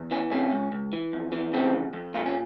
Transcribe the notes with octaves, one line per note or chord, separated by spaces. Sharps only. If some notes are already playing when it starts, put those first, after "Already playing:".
Already playing: E2
E3 C#4
C3 C#4
C#2
C#2
E3
F2
E3
C#3 C4
F2
F2
A#2 F4
C#4